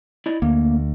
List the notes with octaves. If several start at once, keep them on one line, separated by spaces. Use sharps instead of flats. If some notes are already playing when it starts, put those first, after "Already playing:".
E4 D5 D#5
D2 A#3